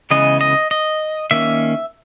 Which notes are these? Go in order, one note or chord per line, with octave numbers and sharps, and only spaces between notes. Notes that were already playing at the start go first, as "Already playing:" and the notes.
C#3 E3 G#3 B3 D#5
D#5
D#5
D#3 A#3 C#4 E5